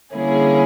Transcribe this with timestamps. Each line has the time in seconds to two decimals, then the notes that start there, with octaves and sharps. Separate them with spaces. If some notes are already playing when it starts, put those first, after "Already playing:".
0.15 D3 G3 A#3 C#4 E4 G#4